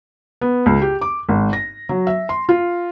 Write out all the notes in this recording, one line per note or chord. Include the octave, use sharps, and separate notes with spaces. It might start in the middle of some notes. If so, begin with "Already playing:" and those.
B3
C#2
G4
D6
G#1
A#6
F#3
E5
C6
F4